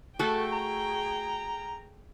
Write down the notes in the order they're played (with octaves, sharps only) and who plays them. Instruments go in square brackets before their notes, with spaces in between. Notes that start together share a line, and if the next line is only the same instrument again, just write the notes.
[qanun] A3 F#4 [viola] G#4 G5 [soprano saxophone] A4
[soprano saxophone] A#5